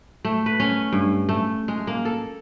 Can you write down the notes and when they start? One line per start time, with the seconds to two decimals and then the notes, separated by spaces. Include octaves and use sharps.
0.25 A3
0.46 B4
0.60 C#4
0.92 G2
1.29 A3
1.68 G#3
1.87 A#3
2.05 A4